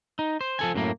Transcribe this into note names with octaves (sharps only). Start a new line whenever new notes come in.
D#4
C5
F3 A4 G#5
F#2 A2 A#3